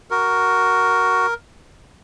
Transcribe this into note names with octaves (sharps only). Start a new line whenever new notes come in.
F#4 A#4